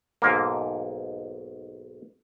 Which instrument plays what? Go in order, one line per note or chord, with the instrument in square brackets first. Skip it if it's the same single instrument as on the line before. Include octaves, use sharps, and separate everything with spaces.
[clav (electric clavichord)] B1 G#2 A#3